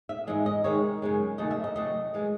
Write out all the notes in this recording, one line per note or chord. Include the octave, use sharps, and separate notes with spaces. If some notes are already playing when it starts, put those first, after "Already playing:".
E5
G#2 E3 G#3 D#5
D#5
C3 D#3 G#3 C#5
F#2 C#3 G#3
D#2 C#3 F#3 A3 D#5
E5
D#5
C3 F#3 A3 D#5
E3 G#3